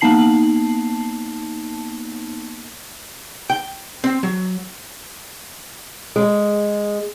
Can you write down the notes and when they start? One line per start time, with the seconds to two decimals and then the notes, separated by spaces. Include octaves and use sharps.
0.01 A#3 B3 D#4 A5 C7 F#7
3.50 G5
4.04 C4
4.23 F#3
6.16 G#3